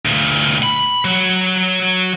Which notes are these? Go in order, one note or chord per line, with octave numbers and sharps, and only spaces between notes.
D2 A#2
B5
F#3